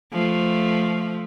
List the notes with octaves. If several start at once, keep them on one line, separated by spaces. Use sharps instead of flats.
F3 A3